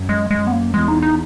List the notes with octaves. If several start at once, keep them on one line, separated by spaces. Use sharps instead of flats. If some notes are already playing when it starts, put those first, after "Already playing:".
Already playing: F#2
G#3
F#2 G#3
B3
A#3
E2 G#3
D#4
D#4